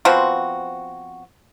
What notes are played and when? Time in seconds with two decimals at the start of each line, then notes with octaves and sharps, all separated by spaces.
0.05 F3 B3 C4 F#4